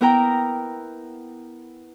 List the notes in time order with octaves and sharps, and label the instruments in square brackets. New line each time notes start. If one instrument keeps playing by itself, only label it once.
[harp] B3 E4 A#4 G5 A#5